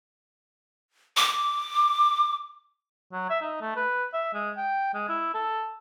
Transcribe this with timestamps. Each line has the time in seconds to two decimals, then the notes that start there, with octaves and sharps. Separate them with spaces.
1.17 D6
3.12 F#3
3.30 E5
3.42 D#4
3.61 A3
3.76 B4
4.14 E5
4.34 G#3
4.57 G5
4.94 G#3
5.09 E4
5.34 A4